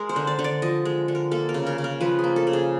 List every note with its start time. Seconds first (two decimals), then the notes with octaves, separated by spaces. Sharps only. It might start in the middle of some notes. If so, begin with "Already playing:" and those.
Already playing: G#3 A#4
0.09 C5
0.16 D3
0.27 D5
0.39 D3
0.44 D5
0.62 F3 D#5
0.85 G#3
1.08 D3
1.15 A#4
1.31 A#3 A4
1.49 A#4
1.54 C#3
1.67 A#4
1.78 C#3
1.84 A#4
2.00 F3 B4
2.19 G#4
2.24 A#3
2.36 A4
2.47 C#3
2.53 G#4